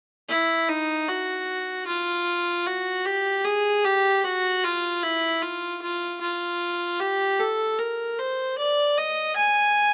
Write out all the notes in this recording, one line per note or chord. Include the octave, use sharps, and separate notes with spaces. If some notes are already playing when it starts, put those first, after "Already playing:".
E4
D#4
F#4
F4
F#4
G4
G#4
G4
F#4
F4
E4
F4
F4
F4
G4
A4
A#4
C5
D5
D#5
G#5